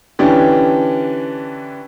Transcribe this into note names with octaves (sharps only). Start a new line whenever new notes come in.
D3 E3 C#4 D4 G4